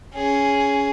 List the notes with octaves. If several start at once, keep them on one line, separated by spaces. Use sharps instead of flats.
C#4 G#4